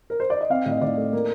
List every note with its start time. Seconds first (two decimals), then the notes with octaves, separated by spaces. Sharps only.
0.10 A#4
0.20 C5
0.30 D5
0.41 D#5
0.50 C4 F5
0.66 A2
0.71 D#5
0.81 A2 D5
0.97 A3
1.13 A#3